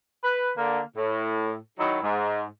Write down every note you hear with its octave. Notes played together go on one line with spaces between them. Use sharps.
B4
D3 A#3
A2
D#3 F#3 D#4 E4
G#2